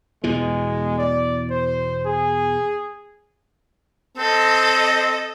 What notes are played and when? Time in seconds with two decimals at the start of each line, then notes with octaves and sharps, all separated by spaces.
0.24 E2 B2 E3 G#3
0.98 D5
1.50 C5
2.05 G#4
4.17 C4 A4 D#5